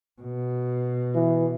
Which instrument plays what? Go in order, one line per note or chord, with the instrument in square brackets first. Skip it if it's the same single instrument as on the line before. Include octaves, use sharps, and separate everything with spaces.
[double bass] B2
[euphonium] E3